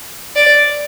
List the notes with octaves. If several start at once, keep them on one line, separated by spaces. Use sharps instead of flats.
D5